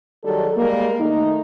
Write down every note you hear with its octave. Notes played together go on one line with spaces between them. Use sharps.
D#3 F#3 G3 G#4 A4
G3 G#3 A#3
D#3 A3 D#4